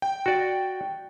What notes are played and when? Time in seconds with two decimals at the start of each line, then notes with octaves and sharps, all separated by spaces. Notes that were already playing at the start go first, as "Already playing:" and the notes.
0.02 G5
0.26 F#4 D5